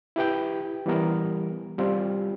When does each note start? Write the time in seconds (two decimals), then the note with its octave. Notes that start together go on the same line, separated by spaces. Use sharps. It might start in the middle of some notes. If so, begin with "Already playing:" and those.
0.16 E4 G4 B4 G5
0.86 E3 G3 B3 A#4
1.78 G3 C4 F4